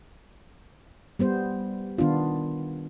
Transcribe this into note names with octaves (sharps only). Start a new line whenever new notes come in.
G3 B3 C5
D#3 B3 D4 F4